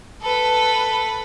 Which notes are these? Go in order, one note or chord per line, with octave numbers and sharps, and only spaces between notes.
A4 B4